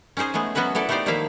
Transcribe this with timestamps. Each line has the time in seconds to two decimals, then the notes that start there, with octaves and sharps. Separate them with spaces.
0.17 C#4 D#4 G#4 C5 D#5
0.34 G#3 A3 B3 G#4
0.55 F#3 B3 C#4 F#4 B4 E5
0.75 B3 E4 A4 D5
0.89 A3 B3 D#4 G4 C5 D5
1.06 D#3 F3 A#3 E4 E5 F5